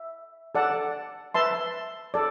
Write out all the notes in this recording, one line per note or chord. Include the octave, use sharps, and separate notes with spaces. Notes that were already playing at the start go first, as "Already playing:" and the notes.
Already playing: E5
A4 D5 F#5 A5
B4 E5 A5 C6
A4 D5